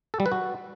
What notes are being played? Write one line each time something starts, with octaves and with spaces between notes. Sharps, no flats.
A4
G3
B4
F#4